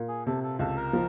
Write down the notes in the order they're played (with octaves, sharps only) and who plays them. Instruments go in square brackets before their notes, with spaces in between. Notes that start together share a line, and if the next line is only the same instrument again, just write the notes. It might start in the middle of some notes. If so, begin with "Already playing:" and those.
Already playing: [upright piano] A#2
[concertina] G#4
[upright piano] C3 [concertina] A4
[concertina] A4
[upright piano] C#2 [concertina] A4
[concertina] A#4
[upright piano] F3